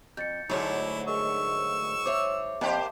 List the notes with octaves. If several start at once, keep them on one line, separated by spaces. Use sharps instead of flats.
F2 G6 A6 C#7
D2 G#2 F#3 A3 E4 C#5
G#4 A#4 D#5 C#6 E6
C5 C#5 E5 D6
F2 A#3 G4 C5